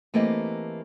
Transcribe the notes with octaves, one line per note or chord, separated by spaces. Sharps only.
E3 A3 A#3 C4 G4 D#5